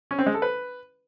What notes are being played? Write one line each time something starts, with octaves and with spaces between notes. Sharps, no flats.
C#4
C4
G#3
A4
B4